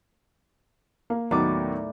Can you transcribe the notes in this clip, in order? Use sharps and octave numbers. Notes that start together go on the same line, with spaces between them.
A#3
D#2 A2 F#3 B3 D5 D6